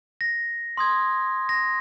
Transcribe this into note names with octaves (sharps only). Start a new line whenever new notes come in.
A#6
C6 D#6 G#6
A#6